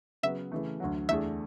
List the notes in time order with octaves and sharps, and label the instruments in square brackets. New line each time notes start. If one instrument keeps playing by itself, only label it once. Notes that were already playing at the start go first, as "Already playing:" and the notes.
[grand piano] C#3 F#3 B3 [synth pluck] E5
[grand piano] C#3 E3 A3
D2 D3 F#3
[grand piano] E2 D3 A3 D4 G#4 [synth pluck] E5